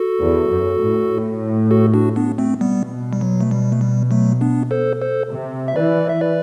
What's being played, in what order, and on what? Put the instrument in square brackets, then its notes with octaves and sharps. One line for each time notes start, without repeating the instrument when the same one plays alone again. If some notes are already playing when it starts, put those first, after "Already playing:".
Already playing: [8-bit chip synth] F#4 A4
[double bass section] E2
F#2
A2
[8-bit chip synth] F#4 A4
D4 F#4
B3 D4
A3 C4
[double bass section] B2 [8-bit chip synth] G3 B3
[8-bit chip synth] G3
F#3
A3
G3
A3
G3
F#3 A3
B3 D4
A4 C5
A4 C5
[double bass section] C3
[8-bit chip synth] E5
[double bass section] E3 [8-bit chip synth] B4 D5
[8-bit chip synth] E5
B4 D5